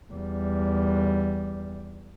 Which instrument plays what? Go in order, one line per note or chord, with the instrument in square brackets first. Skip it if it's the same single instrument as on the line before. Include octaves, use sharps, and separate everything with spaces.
[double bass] E2 G3